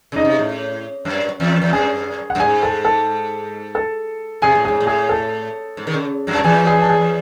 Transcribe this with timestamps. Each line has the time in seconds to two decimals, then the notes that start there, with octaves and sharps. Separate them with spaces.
0.12 C#3 D#4 D#5
0.25 C3
0.39 A2
1.05 F#2
1.40 E2
1.62 E2
1.73 F#2 G#4 G#5
2.30 F#5
2.35 F#2
2.40 G#2 G#4 G#5
2.63 A4 A5
2.85 A4 A5
3.75 A4 A5
4.42 C3 G#4 G#5
4.55 A2
4.65 G#2 G#4 G#5
4.80 A2
4.87 G#4 G#5
5.09 A4 A5
5.77 G#2
5.87 D#3
5.94 C#3
6.27 F#2 F#3
6.35 A5
6.44 E2 E3 G#4 G#5
6.67 G#4 G#5
6.81 A5
6.89 G#4 G#5